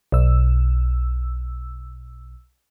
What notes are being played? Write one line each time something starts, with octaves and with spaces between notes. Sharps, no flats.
B1 E6